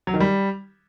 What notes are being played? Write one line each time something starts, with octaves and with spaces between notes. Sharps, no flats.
F#3
D#3
G3